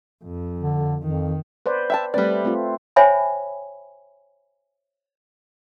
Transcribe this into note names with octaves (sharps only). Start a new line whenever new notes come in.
F2
D3
F2 D#3
B4 C5 D5
E5 G5 A5
G3 A3 C4 B4 D5
A3 C4 F4
C5 C#5 E5 G5 G#5 B5